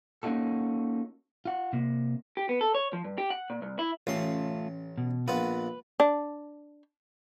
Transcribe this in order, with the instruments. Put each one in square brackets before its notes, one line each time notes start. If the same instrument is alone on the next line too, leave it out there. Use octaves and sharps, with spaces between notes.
[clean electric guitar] A#3 C#4 D#4 F4 F#4 A4
F4 F#5
C3 A#3
G4
B3
A4
C#5
F3
G2
G4
F#5
A#2
C2
E4
[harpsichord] A1 C#4 C6 [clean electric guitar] A3 F4
[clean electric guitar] B2
[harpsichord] A#1 B3 F4 [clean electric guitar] B4
[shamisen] D4